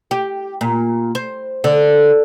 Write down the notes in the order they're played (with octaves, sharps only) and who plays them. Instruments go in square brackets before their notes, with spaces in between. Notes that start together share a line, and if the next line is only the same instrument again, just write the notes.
[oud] G4
A#2
C5
D3